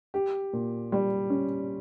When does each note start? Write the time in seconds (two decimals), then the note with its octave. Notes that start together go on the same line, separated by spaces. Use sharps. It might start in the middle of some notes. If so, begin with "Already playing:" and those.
0.14 G4
0.53 A#2
0.92 G3
1.30 C#4